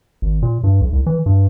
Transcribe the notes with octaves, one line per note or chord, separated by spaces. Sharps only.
G#1
A#2
G2
B1
C2
E3
G2